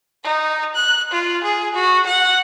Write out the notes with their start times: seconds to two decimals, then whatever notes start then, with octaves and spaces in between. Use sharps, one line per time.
0.23 D#4
0.75 F#6
1.11 F4
1.43 G#4
1.74 F#4
2.07 F#5